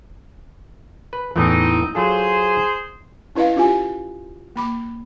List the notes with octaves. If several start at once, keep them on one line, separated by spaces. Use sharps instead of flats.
B4
E2 A2 E3 C4 D#4
F#3 F4 G#4 A4 C5
C#4 E4 B4 D#5 F5
C#4 F4 G4 G#5
A#3 B5 D6